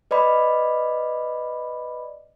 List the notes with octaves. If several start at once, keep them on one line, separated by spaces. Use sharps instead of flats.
B4 D5 D#5 B5